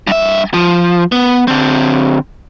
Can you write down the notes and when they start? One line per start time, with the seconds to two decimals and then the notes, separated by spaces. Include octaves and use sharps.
0.07 G2 E5
0.54 F3
1.12 B3
1.48 D3 C4